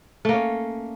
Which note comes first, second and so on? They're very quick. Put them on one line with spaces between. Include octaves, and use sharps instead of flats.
A3 A#3 C#4